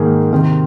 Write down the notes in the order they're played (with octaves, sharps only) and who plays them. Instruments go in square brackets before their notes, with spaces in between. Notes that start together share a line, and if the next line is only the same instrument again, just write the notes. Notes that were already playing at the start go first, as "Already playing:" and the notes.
Already playing: [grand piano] G#2 D#3 A#3 G#4
C3 D#3 C4